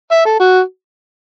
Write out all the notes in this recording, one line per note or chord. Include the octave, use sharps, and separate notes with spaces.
E5
A4
F#4